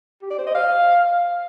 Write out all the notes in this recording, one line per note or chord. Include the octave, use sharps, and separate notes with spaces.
G4
D5
C5
D#5
F5